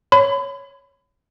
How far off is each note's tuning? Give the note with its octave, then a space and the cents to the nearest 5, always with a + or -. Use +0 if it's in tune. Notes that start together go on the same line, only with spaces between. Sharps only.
C#5 +0 B5 +35